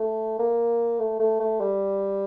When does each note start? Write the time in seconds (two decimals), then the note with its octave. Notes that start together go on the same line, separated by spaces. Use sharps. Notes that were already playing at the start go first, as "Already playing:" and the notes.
Already playing: A3
0.39 A#3
0.99 A3
1.20 A3
1.40 A3
1.60 G3